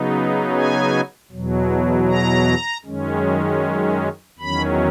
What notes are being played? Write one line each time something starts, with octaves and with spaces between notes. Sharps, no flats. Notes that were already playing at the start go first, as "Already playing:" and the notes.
Already playing: C#3 F#3 B3 D#4
G#5
E2 B2 F#3
A#5
F#2 D#3 G#3 C#4
E2 D#3 F#3 C#4 B5